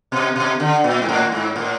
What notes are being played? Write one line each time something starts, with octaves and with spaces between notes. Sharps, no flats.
B2
B2
D3
A#2
G#2
A2
G#2
A2